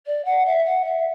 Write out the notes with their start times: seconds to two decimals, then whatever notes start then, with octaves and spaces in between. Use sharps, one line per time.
0.06 D5
0.25 F#5
0.45 E5
0.65 F#5
0.84 E5